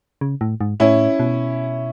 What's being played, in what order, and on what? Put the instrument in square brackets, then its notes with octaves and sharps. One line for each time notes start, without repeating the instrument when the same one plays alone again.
[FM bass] C#3
A2
G#2
[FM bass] A2 [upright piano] C#4 E4
[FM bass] B2